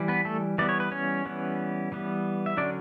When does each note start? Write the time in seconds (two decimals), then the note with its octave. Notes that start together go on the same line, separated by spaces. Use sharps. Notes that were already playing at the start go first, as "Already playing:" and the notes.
Already playing: E3 G3
0.08 B3 B4
0.25 A3 A4
0.58 E3 G3 B3 D5
0.69 C#5
0.80 B4
0.92 C#4 C#5
1.25 E3 G3 B3
1.92 E3 G3 B3
2.46 E5
2.57 D3 F#3 C#4 D4 D5